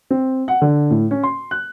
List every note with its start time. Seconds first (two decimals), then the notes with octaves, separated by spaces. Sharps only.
0.11 C4
0.48 F#5
0.62 D3
0.90 A2
1.11 C#4
1.23 C6
1.51 F#6